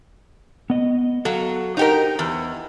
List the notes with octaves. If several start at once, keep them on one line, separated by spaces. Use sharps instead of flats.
B3 D#5
F#3 A4 F5 F#5
D#4 G4 A#4 C5 D#5 F#5
E2